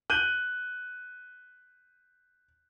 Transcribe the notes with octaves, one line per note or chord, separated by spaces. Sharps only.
F#6 G6 D#7